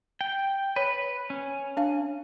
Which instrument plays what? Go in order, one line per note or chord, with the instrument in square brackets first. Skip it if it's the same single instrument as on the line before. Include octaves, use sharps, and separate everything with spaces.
[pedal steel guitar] G5
[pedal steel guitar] B4 [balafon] C#5
[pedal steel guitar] C#4
[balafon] D4 F5